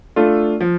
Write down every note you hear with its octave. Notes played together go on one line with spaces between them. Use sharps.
A3 D4 F4 A4
F3